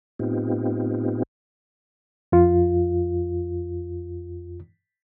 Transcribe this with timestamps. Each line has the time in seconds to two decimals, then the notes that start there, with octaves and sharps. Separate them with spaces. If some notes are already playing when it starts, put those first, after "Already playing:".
0.19 A2 B3 C4 D#4 F4 G4
2.32 F2 F4